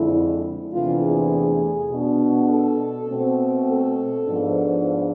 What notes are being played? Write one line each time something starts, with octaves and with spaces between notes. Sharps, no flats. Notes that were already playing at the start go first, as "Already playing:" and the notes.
Already playing: F2 D3 G#3 E4
E2 C3 E3 A3 D4 F4
G#4
B2 B3 D4
A4
B2 A3 C4
A4
G#2 F3 B3 D4